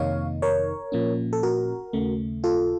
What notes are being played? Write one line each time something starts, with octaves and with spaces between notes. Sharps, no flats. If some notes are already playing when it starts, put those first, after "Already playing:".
Already playing: F2 C3 D#3 A#3 D#4 C#5 F5
A#4 C#5
A#2 F3 A#3 C#4
A4
F#4 A#4
D#2 C#3 A3
F4 A4